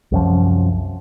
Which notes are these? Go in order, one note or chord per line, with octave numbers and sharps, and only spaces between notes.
C2 F#2 F3